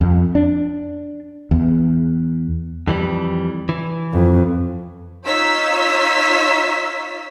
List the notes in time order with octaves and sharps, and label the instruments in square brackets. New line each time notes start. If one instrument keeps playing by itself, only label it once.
[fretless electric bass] F2
D4
E2
[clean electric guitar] F2 E3 G3
E3
[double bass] F2
[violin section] D#4 F4 C#5 E6 B6